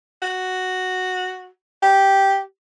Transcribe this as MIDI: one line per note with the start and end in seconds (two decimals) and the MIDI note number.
0.22 1.47 66
1.83 2.39 67